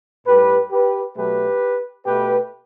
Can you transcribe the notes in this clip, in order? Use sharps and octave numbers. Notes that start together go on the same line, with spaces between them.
A2 G3 G4 B4
G4 B4
B2 F#3 A3 G4 B4
B2 A3 G4 B4